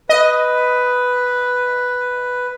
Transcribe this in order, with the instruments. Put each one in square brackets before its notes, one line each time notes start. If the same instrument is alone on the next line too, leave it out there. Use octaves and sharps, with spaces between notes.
[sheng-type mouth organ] B4 [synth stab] D#5